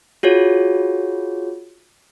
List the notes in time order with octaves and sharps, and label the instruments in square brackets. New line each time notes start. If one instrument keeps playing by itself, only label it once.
[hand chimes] F4 F#4 G#4 C#5